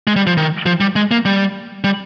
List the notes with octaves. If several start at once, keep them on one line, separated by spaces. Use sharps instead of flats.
G#3
G3
F3
D#3
F3
G3
G#3
A#3
G3
G3